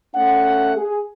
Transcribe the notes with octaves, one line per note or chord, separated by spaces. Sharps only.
A3 C#4 F#5
G#4